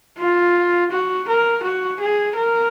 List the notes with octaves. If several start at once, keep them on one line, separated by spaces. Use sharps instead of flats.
F4
F#4
A#4
F#4
G#4
A#4